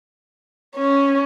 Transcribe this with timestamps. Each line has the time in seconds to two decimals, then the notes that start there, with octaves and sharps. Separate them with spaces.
0.76 C#4